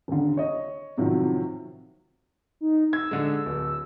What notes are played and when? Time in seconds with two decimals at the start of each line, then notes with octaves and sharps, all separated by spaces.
0.08 D#1 D3
0.37 C#5 D#5
0.97 A2 C3 D#3 F3 F#3
2.61 D#4
2.93 E6 G#6
3.11 D3 G#3
3.46 D1